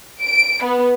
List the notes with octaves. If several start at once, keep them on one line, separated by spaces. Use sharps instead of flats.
D7
B3